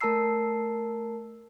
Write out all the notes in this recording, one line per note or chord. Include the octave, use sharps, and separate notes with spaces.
A3 A#4 A5 A#5 E6 C7